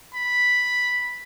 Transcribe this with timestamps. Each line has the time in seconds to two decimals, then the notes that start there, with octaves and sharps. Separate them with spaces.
0.15 B5